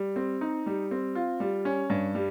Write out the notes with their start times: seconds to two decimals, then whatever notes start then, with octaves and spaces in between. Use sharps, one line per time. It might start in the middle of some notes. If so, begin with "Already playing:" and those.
Already playing: G3
0.16 C4
0.41 D#4
0.66 G3
0.91 C4
1.15 F4
1.40 G3
1.65 C#4
1.90 G2
2.15 G3